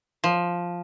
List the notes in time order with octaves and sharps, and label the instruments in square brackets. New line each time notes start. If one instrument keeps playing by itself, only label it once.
[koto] F3